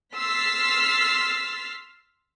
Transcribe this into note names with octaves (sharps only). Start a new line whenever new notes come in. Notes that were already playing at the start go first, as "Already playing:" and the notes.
C6 E6 F6 A6 B6 C7